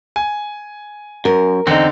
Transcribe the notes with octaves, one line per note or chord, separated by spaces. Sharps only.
G#5
F#2 A#4
E2 D3 C4 D#4